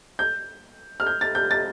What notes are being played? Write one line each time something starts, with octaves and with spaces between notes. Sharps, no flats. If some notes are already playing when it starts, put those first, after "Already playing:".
G6
F6
G6
A6
G6
A6